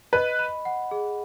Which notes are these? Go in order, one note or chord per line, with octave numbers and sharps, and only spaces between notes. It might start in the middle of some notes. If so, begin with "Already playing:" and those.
B4 D#5
B5
F#5
G#4